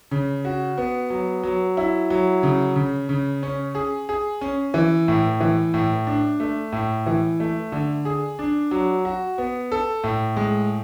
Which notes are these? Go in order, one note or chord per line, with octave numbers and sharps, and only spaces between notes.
C#3
F#4
B3
F#3
F#3
E4
F#3
C#3
C#3
C#3
C#4
G#4
G#4
C#4
E3
A2
E3
A2
D4
A3
A2
E3
A3
D3
G#4
D4
F#3
F#4
B3
A4
A2
G#3